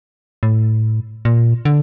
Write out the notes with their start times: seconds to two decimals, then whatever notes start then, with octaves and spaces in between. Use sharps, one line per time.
0.43 A2
1.25 A#2
1.65 D3